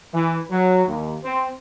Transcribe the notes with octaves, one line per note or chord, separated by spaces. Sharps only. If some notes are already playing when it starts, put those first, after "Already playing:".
E3
F#3
D#2
C4